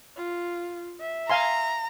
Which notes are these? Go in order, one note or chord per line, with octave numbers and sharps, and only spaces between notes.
F4
E5
F5 G#5 A#5 C6